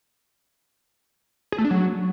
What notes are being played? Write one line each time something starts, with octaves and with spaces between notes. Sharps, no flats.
G#4
A3
D4
F#3